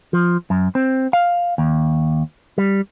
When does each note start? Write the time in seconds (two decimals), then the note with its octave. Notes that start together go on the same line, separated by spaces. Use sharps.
0.13 F3
0.50 F#2
0.75 C4
1.13 F5
1.58 D#2
2.58 G3